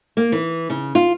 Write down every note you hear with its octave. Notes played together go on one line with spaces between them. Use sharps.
A#3
E3
C#3
F4